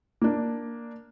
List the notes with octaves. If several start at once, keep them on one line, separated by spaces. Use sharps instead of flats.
A#3 D4